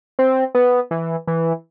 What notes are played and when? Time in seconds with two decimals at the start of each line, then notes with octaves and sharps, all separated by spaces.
0.19 C4
0.55 B3
0.91 E3
1.27 E3